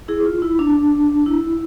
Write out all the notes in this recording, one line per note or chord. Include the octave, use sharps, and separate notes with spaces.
E4 G#4
F4
E4
D4
E4